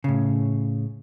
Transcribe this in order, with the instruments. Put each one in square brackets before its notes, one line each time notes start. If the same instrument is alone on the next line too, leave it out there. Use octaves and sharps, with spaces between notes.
[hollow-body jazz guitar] A2 C#3